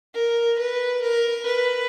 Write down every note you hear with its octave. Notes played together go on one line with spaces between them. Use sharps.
A#4
B4
A#4
B4